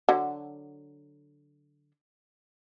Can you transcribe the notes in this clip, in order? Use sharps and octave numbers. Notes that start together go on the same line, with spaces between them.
D3 F#3